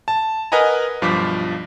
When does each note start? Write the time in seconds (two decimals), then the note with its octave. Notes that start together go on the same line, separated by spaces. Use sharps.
0.08 A5
0.52 A#4 B4 D#5 F#5 G#5 A#5
1.01 B1 G2 F3 C5 D6 B6